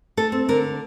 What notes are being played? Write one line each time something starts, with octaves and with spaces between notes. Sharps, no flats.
A3 A4
C4
D3 A#4